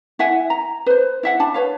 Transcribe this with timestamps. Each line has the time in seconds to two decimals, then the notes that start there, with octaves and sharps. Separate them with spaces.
0.19 E4 E5 F#5 G#5
0.50 A#5
0.86 B4 C5
1.23 E4 E5 F#5
1.40 D4 A5 B5
1.54 B4 C#5 F5